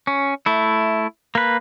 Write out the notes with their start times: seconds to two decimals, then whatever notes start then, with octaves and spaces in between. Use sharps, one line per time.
0.07 C#4
0.46 A3 E4
1.35 A#3 B4